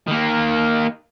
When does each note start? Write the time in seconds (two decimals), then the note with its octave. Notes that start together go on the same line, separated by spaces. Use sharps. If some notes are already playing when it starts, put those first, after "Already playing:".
0.07 D#3 A#3